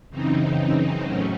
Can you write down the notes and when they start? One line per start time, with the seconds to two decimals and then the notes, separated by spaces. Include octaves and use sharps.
0.10 F#2 C#3 E3 C4 D#4
1.03 A2 F#3 C#4